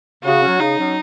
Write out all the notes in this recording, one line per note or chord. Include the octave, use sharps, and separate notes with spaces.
C#3 F#4
F#3 C#4
C#3 D#4
F#3 C#4